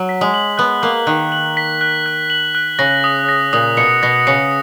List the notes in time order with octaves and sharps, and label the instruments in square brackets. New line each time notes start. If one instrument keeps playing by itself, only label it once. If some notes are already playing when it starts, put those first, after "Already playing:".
Already playing: [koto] F#3
[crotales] B6
[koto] G#3
[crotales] F#7
[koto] B3 [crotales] F#6
[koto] A#3 [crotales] F#6
[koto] D#3 [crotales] F#6
[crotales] F#7
B6
F#6
F#6
F#7
F#6
[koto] C#3 [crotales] A#6
[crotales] D#6
A#6
[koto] A#2 [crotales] D#6
[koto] B2 [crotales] C#7
[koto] B2 [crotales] A#6
[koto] C#3 [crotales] C#7